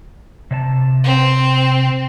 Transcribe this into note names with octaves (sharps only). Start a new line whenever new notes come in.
C3 C#5 A5
C4